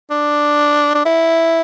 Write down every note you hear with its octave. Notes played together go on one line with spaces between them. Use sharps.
D4
D4
E4